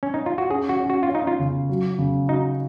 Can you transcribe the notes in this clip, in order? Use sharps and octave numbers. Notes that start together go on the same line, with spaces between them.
C#4
D#4
F4
F#4
C#4 G#4
F#4
C#4
F#4
F4
C#4
D#4
F4
C#3
F#3
C#3
D#4 F#4